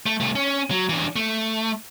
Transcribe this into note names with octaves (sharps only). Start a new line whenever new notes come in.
A3
C2 A3
C#4
F#3
E3 D4
A3